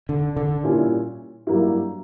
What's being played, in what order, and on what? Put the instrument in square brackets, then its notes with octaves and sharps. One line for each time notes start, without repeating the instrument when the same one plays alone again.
[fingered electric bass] D3
D3
[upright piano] A#2 G3 C#4 E4
G2 F#3 A#3 E4 G4